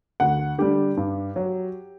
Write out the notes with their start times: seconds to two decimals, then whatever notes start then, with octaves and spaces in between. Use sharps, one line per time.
0.20 D2 F#5
0.58 D3 G3 G4
0.97 G2
1.36 F#3